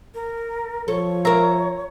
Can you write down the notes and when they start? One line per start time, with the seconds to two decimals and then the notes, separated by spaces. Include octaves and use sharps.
0.15 A#4
0.88 F3 A4 C#5
1.25 A#4 E5 A#5